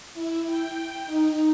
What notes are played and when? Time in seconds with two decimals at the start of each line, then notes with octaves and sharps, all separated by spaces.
0.14 E4
0.45 G5
1.06 D#4